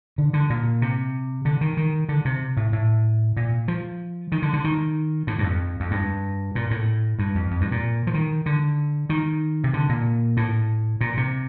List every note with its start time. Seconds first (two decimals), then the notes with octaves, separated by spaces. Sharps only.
0.18 D3
0.33 D3
0.50 A#2
0.82 C3
1.45 D3
1.61 D#3
1.77 D#3
2.09 D3
2.25 C3
2.57 A2
2.72 A2
3.37 A#2
3.68 F3
4.32 D#3
4.42 D3
4.53 D3
4.64 D#3
5.27 A2
5.39 G2
5.43 F2
5.80 F2
5.91 G2
6.55 A#2
6.71 A2
7.19 G2
7.35 F2
7.51 F2
7.61 G2
7.72 A#2
8.07 F3
8.14 D#3
8.46 D3
9.10 D#3
9.64 C3
9.74 D3
9.89 A#2
10.37 A2
11.01 A#2
11.17 C3